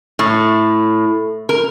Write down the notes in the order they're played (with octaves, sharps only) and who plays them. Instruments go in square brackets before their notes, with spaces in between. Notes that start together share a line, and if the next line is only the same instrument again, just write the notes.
[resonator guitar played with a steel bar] A2
A#4